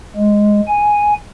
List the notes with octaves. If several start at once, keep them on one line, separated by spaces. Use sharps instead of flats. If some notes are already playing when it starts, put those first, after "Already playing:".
G#3
G#5